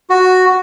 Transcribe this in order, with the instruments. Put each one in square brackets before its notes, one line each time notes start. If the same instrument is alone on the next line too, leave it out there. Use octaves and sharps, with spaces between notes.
[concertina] F#4